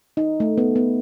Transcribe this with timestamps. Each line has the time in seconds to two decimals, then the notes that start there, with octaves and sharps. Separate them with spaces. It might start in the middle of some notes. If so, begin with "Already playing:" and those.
0.17 D#4
0.40 A3
0.58 B3
0.76 B3